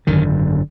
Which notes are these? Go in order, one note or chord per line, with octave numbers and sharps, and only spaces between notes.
G#1 F#2 D3 D#3